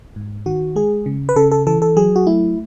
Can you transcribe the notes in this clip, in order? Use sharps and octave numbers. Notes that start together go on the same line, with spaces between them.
G#2
D#3 F#4
G#3 G#4
C#3
B4
C#3 A4
A4
E3 A4
A4
F#3 G#4
F#4
A3 E4